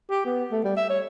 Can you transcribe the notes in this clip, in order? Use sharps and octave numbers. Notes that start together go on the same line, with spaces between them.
G4
B3
A3
G3
E5
C#5